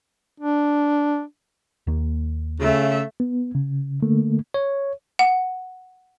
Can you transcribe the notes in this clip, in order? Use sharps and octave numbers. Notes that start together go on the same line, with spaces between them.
D4
D#2 A#3
C#3 A3 E5
B3
C#3
D3 A3 A#3
C#5
F#5